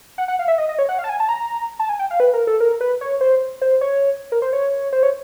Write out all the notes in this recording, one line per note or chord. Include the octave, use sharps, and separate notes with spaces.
F#5
F#5
F5
E5
D#5
D#5
C#5
F#5
F5
A5
G#5
A5
A#5
A5
G#5
G5
F5
B4
A#4
A4
A#4
B4
C#5
C5
C5
C#5
A#4
C5
C#5
C5
C#5